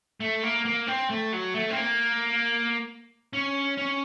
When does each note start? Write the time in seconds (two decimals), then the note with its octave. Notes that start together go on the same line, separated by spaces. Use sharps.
0.20 A3
0.43 A#3
0.65 A#3
0.87 C4
1.10 A3
1.33 F#3
1.54 A3
1.70 C4
1.77 A#3
3.33 C#4
3.77 C#4